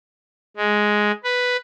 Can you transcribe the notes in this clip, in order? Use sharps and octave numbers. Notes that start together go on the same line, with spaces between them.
G#3
B4